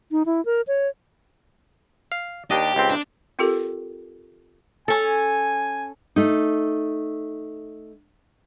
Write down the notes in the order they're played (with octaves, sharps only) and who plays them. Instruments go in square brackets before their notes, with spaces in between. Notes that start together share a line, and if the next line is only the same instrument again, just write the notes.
[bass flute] D#4
E4
A#4
C#5
[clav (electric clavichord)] F5
[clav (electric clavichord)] D#2 D4 D#5 [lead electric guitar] G4
[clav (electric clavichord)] C#2 C4
[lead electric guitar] D4
[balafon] C4 F4 G4 A4 A#4
[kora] C#4 A4 [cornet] G#5
[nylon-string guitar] A3 D#4